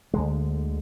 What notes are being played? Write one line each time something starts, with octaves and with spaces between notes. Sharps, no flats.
D2 D3 G#3